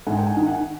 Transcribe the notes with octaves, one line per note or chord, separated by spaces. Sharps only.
G#2 F#5 G#5
G5
F#5 G#5
D#3
F#5 G#5